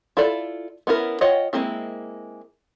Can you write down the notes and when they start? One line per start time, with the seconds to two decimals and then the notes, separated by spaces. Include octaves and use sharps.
0.17 E4 F4 A4 D5
0.87 B3 C#4 E4 A#4
1.21 F4 C#5 D#5 F#5 G5
1.53 G#3 A#3 C4 E4